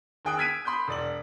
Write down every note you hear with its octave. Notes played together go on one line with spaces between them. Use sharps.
D#2 G#4 G5 D#6 F#6 D7
E6 F6 G#6 B6 D7 D#7
B5 C6 D#6 G6
E1 D5 F#7